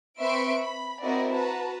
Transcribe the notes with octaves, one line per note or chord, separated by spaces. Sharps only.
C4 B4 E5 C6 C#6 D7
B5
C4 E4 F#4 A#4 D5 D#5
F#4 B4 A5 A#5